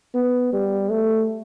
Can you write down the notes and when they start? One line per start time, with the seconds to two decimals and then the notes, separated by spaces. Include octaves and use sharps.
0.15 B3
0.53 G3
0.90 A3